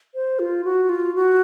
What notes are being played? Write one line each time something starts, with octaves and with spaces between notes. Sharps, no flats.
C5
F4
F#4
F4
F#4